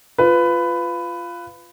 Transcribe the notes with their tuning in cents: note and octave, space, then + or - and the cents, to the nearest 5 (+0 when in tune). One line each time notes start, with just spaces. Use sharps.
F4 -5 B4 +15